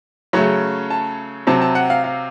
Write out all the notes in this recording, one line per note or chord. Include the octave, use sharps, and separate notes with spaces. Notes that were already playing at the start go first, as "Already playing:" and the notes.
C#3 F#3 A3 C#4
A5
C3 F#3 C4 A5
A5
F#5
F5
F5